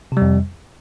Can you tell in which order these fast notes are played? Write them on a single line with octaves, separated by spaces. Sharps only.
C3 G3 F2